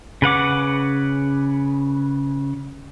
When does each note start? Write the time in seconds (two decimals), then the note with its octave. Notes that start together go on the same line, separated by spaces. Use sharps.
0.22 C#3 B4 F#5 D6